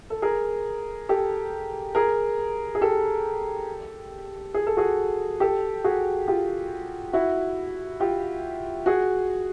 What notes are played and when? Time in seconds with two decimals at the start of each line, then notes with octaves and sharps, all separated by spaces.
0.10 A4
0.22 G#4 A#4
1.09 G4 A4
1.95 G#4 A#4
2.75 G#4
2.81 G4 A4
4.54 G#4
4.67 A4
4.77 F#4 G#4
5.40 G4 A4
5.84 F#4 G#4
6.28 F4 G4
7.13 E4 F#4
8.00 F4 G4
8.86 F#4 G#4